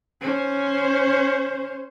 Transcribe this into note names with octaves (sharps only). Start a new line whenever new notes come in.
C#4 C5